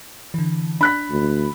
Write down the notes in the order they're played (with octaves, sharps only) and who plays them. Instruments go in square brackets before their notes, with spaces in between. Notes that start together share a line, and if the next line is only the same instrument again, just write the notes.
[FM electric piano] D3 E3
[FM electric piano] D4 [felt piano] B5 F#6 B6
[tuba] D2